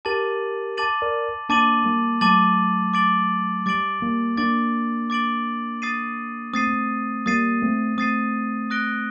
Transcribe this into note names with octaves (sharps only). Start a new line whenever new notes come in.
G4 A#4 A5 D6 A6 D#7 F#7
A5 D6 A6 D#7 F#7
A#4 D5
A#3 D4 A5 D6 A6 D#7 F#7
G3 A#3
F#3 A3 A5 D6 A6 D#7 F#7
D6 A6 D7 F#7
G3 D6 A6 D7 F#7
G3 A#3
A#3 D4 D6 A6 D7 F#7
D6 A6 D7 F#7
D#6 A6 C7 D#7
A3 C4 D#6 A6 C7 D#7
G3 A#3 D#6 A6 C7 D#7
A3 C4
A3 C4 D#6 A6 C7 D#7
D#6 F#6 A#6 D7 G7